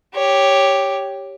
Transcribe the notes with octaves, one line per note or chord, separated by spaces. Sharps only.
G4 C#5